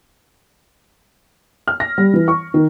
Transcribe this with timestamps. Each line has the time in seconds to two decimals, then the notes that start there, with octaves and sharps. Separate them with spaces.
1.68 F6
1.80 A#6
1.98 G3
2.14 E3
2.28 C#6
2.54 D#3